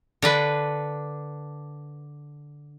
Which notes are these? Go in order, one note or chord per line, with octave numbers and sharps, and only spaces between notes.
D3 D4 B4